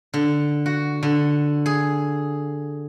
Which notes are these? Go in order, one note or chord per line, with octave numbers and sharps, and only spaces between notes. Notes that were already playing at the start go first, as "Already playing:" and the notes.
D3
F#4
D3
G#4